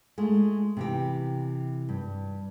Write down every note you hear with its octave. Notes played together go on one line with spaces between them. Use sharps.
G#3 A3 F4
C3 E3 G4
G2